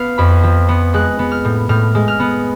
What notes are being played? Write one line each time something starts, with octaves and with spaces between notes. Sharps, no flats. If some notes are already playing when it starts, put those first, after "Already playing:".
Already playing: B3 B4 F5
F2 B5
F3
B3
G#3 F#6
B3
F6
A2
A2 F6
G#3
F6
B3